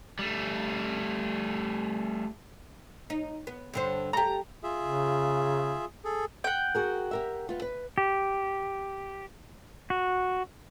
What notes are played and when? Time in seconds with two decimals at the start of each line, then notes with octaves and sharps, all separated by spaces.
0.19 G3 A3
3.10 D#4
3.47 B3
3.74 G2 D3 C5
4.13 G4 A4 A#5
4.63 F4 G#4 E5
4.82 C#3
6.05 G#4 A4
6.44 F#5 G5
6.75 F#4 G#4 A#4
7.11 G4 A#4 E5
7.49 B3 F4
7.62 B4
7.98 G4
9.90 F#4